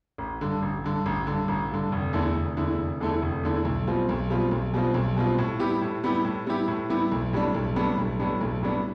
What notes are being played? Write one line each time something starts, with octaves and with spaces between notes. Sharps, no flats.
A1
G2 D3
A1
G2 D3
A1
G2 D3
A1
G2 D3
F1
E2 D3 A3 E4
F1
E2 D3 A3 E4
F1
E2 D3 A3 E4
F1
E2 D3 A3 E4
B1
B2 G3 C4 F4
B1
B2 G3 C4 F4
B1
B2 G3 C4 F4
B1
B2 G3 C4 F4
A2
G3 B3 E4 G4
A2
G3 B3 E4 G4
A2
G3 B3 E4 G4
A2
G3 B3 E4 G4
B1
A2 G3 B3 D4
B1
A2 G3 B3 D4
B1
A2 G3 B3 D4
B1
A2 G3 B3 D4